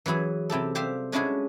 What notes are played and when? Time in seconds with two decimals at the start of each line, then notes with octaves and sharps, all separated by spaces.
0.06 E3 F#3 E4 G#4
0.50 C3 E4 G4 A4
0.75 G3 G4 C5 E5 F5
1.12 G#3 C#4 D4 E4 F#4 G#4